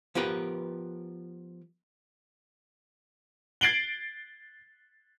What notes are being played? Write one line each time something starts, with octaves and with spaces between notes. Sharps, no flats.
F3 B3 G4 A#4 B4
G#6 A6 C7 D7 F#7 G7